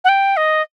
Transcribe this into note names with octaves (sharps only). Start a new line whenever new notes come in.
F#5
G5
D#5